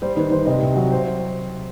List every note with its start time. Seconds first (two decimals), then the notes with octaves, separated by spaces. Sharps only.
0.02 G3 C5
0.17 D#3 B4
0.32 D#3 C5
0.46 C3 D#5
0.61 C2
0.76 F#3
0.92 C5